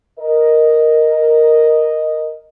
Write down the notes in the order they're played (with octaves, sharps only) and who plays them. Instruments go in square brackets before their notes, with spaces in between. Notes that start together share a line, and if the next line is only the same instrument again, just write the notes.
[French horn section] A#4 D#5